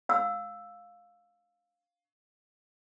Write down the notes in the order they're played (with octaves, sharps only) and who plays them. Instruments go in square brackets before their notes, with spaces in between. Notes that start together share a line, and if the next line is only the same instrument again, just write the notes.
[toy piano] F5 E6